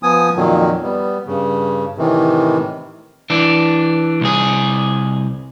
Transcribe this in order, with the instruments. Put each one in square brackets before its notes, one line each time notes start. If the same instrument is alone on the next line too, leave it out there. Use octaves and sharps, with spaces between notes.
[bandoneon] F3 B3 G#5 D#6
F2 A#2 D#3 F#3
G3 B3
G2 C#3
A2 C3 D#3 E3
[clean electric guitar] E3 D4
C2 G#4